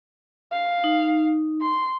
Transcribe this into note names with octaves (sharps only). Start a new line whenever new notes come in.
F5
D#4
C6